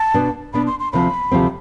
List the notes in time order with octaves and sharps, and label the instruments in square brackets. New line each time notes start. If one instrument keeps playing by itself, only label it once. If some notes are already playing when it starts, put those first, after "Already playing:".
Already playing: [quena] A5
[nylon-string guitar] B2 B3 D4
[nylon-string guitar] B2 B3 D4 [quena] B5
[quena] C6
C6
[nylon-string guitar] D2 C3 F3 C4 [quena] B5
[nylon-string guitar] D2 C3 F3 C4